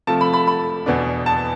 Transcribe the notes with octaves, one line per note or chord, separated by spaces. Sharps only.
C3 F3 A3 A5
B5
B5
B5
E2 B2 B3 D4
A5